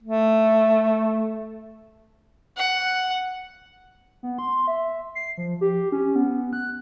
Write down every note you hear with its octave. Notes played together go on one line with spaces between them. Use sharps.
A3
F#5
B3
C6
E5
C7
F3
G4
C#4
B3
F#6